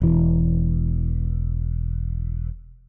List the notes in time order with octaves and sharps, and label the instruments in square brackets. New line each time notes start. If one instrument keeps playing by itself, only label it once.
[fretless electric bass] E1 E3